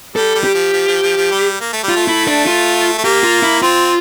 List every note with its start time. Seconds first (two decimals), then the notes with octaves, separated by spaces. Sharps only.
0.16 G3 A4
0.35 G3
0.44 G4
0.54 F3
0.73 F3
0.88 F3
1.03 F3
1.17 F3
1.31 G3
1.61 A#3
1.73 A3
1.83 G3
1.89 F4
1.96 A3
2.08 E4
2.28 D4
2.47 F4
2.98 A3
3.04 A#3 G4
3.24 F4
3.43 E4
3.62 C4 F4